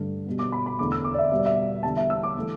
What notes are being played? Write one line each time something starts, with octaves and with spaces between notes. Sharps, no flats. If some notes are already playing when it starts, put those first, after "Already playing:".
Already playing: G2 D3 A3
B2 G3 B3
D6
B5
B5
E2 D3 A3 D6
E6
D6
D5
E5
B2 G3 B3 E5
D5
E5
E2 D3 G3 B3 A5
E5
E6
D6
E3 A3